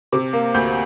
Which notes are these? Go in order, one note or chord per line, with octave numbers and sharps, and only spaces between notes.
C3 D6
A#3
D2 G6